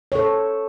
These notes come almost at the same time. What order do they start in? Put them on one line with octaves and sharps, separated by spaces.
C#5 A4 C5